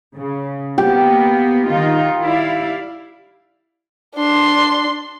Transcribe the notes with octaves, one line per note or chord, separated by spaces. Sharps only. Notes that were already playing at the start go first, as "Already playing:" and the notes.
C#3
A#3 B3 G4
D#3 D#4 F4
E4 D5 F5
D4 C6